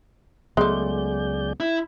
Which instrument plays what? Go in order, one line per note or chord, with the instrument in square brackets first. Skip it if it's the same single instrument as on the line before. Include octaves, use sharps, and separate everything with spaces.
[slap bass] C#2 F#3 B3 [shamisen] G#3 A3 [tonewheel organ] G#4 D5 G6
[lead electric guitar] E4